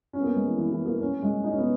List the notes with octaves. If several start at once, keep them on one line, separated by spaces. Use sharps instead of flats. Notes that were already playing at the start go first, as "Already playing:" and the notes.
C#4
B3
A#3
G#3
E3
E3
E3
A#3
C#4
G#3
D#4
C#4
B3